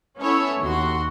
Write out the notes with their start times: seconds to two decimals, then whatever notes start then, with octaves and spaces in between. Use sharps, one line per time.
0.19 B3 C#4 E4 A4 C#5 E5
0.61 D#2 F#4 C6